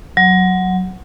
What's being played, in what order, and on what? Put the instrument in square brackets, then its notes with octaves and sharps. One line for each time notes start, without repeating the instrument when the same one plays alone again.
[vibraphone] F#3